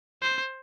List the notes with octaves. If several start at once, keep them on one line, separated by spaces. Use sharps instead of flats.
C5